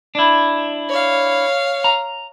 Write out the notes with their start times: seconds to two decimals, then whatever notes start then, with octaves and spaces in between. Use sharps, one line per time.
0.15 D4 E4
0.89 C#5 F5
1.84 A#5